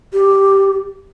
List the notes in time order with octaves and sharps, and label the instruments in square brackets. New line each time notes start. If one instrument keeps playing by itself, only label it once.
[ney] G4